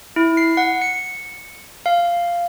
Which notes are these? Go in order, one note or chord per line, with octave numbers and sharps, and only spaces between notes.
E4
C7
F#5
C#7
F5